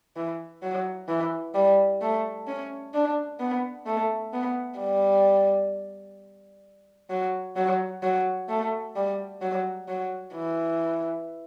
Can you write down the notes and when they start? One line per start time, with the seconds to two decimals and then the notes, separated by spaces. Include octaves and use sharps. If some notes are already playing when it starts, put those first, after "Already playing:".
0.17 E3
0.63 F#3
1.08 E3
1.55 G3
2.02 A3
2.48 C#4
2.94 D4
3.40 B3
3.86 A3
4.33 B3
4.79 G3
7.10 F#3
7.56 F#3
8.03 F#3
8.49 A3
8.96 G3
9.41 F#3
9.88 F#3
10.35 E3